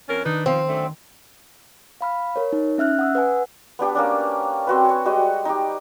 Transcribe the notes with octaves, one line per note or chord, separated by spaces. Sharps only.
F2 C#4 A#4 A6
D#3 D4 D#4 B4
F3 C4
F#2 D3 A3
F5 B5 F6
A#4 C#5
D#4
C#4 E5 F6 F#6
F#5 D#6 E6
B4 F#5 G#5
B3 D4 G4 F#5
A#3 C#4 D4
C4 F#4 B4
C#5 G#5
G3 G#3 F#4 D#5
D#4 G4